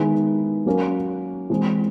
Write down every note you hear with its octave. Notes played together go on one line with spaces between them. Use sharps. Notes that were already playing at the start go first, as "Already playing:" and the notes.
Already playing: D#3 G#3 B3 E4 G#4
F#3 A#3 C#4
E3 G#3 C4